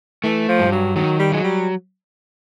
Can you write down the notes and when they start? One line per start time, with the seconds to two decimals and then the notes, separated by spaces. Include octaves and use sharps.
0.24 E3 A3
0.49 F3
0.59 G2
0.72 F#3
0.96 D#3 F#3
1.19 G3
1.32 F#3 G#3
1.44 G3